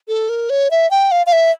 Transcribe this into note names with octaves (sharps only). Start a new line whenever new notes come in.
A4
A#4
C#5
E5
G5
F5
F5
E5